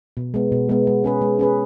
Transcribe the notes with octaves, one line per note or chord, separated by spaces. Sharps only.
B2
G#3 B3
B2
G#3 B3
G#3
C#4 G#4 B4
G#3
C#4 G#4 B4